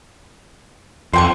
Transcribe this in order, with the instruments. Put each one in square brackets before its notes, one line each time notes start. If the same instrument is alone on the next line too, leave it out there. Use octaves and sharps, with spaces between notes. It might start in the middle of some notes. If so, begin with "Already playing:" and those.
[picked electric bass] F2 [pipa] C5 G5 C#6